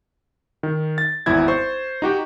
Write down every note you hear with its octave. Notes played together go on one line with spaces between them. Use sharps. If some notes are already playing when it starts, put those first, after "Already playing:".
D#3
A6
G#1 E2 E4 G#6
C5 C#6
D#4 F#4 G4